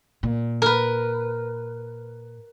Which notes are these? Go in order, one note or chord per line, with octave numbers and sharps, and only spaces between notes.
A#2
A#4 B4